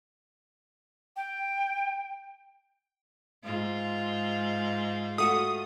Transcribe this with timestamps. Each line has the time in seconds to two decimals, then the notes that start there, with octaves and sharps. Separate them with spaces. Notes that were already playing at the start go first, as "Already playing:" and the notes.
1.16 G5
3.44 G#2 F4
5.18 A3 F#4 D#6